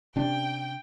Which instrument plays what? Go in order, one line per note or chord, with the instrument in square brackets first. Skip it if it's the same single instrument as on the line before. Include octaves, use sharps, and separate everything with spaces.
[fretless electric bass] C3 C#4 D4 [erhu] G5